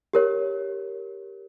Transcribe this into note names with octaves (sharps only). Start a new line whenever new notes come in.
G4 A#4 C#5